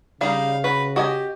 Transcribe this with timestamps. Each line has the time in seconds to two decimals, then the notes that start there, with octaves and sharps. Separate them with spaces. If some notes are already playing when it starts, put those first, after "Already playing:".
0.21 C#3 G3 D#4 F5
0.64 F#4 B4
0.96 F#4 G4 D#5 G#5